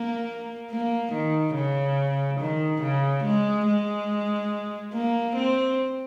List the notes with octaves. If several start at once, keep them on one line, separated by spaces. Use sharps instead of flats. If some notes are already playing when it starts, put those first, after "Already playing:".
Already playing: A#3
A#3
D#3
C#3
D#3
C#3
G#3
G#3
A#3
C4